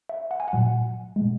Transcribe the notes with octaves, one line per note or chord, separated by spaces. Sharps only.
E5
F#5
G#5
F#5
A#2 F#3
G#3
B2